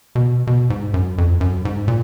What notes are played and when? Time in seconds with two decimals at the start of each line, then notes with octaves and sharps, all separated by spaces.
0.15 B2
0.47 B2
0.70 G#2
0.94 F#2
1.18 F2
1.41 F#2
1.65 G#2
1.88 A#2